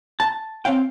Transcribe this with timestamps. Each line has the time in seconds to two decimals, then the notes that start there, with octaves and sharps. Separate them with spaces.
0.20 A5
0.65 C4 C#5 F5 G5